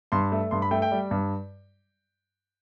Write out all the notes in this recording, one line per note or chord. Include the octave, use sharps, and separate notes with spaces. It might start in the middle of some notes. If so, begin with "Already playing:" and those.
G2 C6
A3
G2 C6
B5
A3 G5
G5
G3
G2